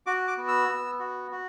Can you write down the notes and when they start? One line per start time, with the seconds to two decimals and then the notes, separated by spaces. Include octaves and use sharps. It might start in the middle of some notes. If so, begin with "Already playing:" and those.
0.06 F#4 D6
0.28 D6
0.37 B3
0.48 E6
0.69 B3
0.99 F#4
1.31 F#4